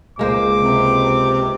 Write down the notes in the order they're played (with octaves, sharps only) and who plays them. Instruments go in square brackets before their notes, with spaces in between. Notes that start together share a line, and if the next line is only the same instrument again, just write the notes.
[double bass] C#2 [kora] G#3 A#3 C5 [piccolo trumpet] D6
[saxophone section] C3